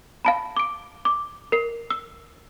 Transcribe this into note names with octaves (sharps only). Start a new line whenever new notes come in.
F5 A5 B5
D6 D7
D6
A#4 C7
E6